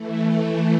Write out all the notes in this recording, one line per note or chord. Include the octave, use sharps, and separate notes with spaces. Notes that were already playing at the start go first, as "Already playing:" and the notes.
Already playing: E3 A3
E3 A3